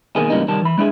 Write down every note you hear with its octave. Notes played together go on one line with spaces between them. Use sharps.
B2 D#3 A#3 G#4
G#2 C#3 E3 G3 A#3 D#4
C2 D#3 G3 A5
E3 B5
G#3 D4 E4 G4 G#4